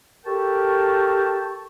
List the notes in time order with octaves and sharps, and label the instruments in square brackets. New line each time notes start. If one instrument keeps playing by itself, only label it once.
[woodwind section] G4 A4 A#4 G5 A5 C#6